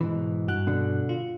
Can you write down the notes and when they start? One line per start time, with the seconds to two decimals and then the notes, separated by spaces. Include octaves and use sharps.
0.01 G#2 B2 E3
0.48 G2 F#4 F#6
0.67 B2 D3
1.09 F4